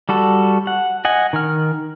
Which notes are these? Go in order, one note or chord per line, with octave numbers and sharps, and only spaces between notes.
G3 F#4 A4
F#5
D#5 F#5 G#5
D#3 F6